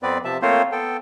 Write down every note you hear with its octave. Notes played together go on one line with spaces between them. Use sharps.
F2 B3 C4 B4 D5
C3 F3 E5 A5
A3 A#3 C4 F4 C5 C#5
B3 A4 G5